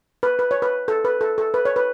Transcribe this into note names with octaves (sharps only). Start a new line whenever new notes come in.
B4
B4
C#5
B4
A4
B4
A4
A4
B4
C#5
B4